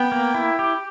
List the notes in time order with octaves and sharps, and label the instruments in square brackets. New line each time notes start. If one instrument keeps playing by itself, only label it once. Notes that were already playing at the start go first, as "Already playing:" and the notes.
Already playing: [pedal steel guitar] B3 [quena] G5
[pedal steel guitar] A#3
E4
G4